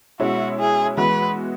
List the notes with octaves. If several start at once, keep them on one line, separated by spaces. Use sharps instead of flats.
B2 G#3 C#4 E4 F#4
G#4
E3 G#3 B3 F#4 B4